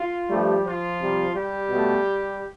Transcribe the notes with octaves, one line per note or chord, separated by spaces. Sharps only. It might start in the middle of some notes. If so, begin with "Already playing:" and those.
Already playing: F4
G2 F3 G3 A3 G4
F3 F4
C3 G3
G3 G4
B2 A3